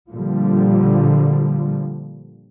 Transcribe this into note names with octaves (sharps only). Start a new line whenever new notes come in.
A#2 D3 F3 G3